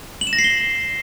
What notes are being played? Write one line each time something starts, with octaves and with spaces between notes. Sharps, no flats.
F#7
E7
A#6
C7
G7